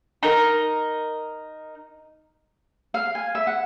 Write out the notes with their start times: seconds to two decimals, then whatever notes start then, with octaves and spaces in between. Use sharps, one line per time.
0.23 D#4 A#4
2.94 F5
3.15 G#5
3.35 E5
3.47 F#5